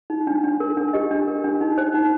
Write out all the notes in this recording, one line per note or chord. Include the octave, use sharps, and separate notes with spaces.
D#4
D4
D4
A#4
D4
G4 D#5
D4
A#4
D4
D#4
C5
D#4